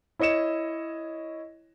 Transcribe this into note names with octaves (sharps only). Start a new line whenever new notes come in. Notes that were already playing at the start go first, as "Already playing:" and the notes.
E4 C#5 D#5 C#7 E7